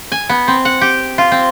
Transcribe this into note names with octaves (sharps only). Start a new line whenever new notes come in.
G#5
B3
C4
F#5
G4
F4
C4